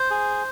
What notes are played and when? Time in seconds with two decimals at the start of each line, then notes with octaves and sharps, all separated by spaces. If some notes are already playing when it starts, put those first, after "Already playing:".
Already playing: C5
0.11 G#4